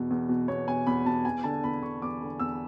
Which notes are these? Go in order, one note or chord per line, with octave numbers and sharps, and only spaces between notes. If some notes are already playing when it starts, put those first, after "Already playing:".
Already playing: E2 B2
E2
B2
E2 C#5
B2 G#5
E2 B5
B2 A5
E2 G#5
D3 A5
E2 B5
D3 C#6
E2 D6
D3
E2 E6